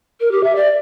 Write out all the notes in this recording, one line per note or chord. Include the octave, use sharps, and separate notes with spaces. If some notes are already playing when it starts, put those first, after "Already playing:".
A#4
G4
E5
D5